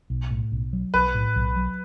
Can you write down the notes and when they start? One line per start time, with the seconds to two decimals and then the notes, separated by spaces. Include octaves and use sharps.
0.10 B1
0.31 A2
0.52 B1
0.73 F#3
0.94 B1 B4
1.15 A2
1.36 B1
1.56 F#3